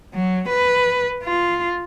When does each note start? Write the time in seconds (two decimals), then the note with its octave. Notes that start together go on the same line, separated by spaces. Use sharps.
0.14 F#3
0.49 B4
1.23 F4